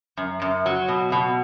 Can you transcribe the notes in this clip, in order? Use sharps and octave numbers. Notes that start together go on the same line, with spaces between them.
F#2
F#2
F#3
B2
B2